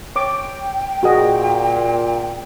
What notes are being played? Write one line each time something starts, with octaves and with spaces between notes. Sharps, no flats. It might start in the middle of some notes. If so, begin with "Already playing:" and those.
C#5 G5 D6
A#2 F#4 G#4 D#5